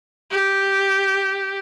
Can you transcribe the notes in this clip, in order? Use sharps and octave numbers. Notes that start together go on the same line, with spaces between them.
G4